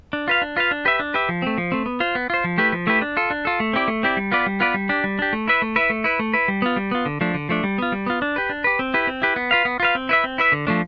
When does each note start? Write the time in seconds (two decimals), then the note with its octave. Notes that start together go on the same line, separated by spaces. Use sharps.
0.13 D4
0.28 F4 B4 F5
0.42 D4
0.57 F4 B4 F5
0.71 D4
0.85 G4 B4 E5
1.00 D4
1.14 G4 B4 E5
1.29 F3
1.42 A3 C4
1.58 F3
1.72 A3 C4
1.86 B3
2.00 F4 C5
2.15 B3
2.30 F4 C5
2.44 F3
2.58 A3 E4 G4 B4
2.73 F3
2.87 A3 E4 G4 B4
3.02 D4
3.17 F4 A4
3.30 D4
3.45 F4 A4
3.60 A3
3.73 C4 E4 G4 D5
3.88 A3
4.03 C4 E4 G4 D5
4.17 G3
4.32 B3 F4 B4 D5
4.46 G3
4.60 B3 F4 B4 D5
4.74 G3
4.89 D4 G4
5.04 G3
5.19 D4 G4
5.33 A3
5.48 E4 B4 E5
5.62 A3
5.76 E4 B4 E5
5.90 A3
6.04 E4 B4
6.19 A3
6.34 E4 B4
6.48 G3
6.62 B3 F4
6.76 G3
6.91 B3 F4
7.06 D3
7.21 F3 A3 D4
7.34 D3
7.49 F3 A3 D4
7.64 G3
7.78 B3 F4
7.92 G3
8.06 B3 F4
8.22 D4
8.36 G4 B4
8.50 D4
8.64 G4 B4
8.79 C4
8.94 E4 G4 B4
9.07 C4
9.22 E4 G4 B4
9.36 B3
9.51 F4 B4 F5
9.65 B3
9.80 F4 B4 F5
9.95 C4
10.09 E4 B4 E5
10.24 C4
10.38 E4 B4 E5
10.52 D3
10.67 F3 A3 D4